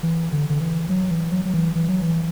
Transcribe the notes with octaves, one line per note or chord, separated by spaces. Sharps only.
E3
D3
D3
E3
F#3
E3
F#3
F#3
E3
E3
F#3
E3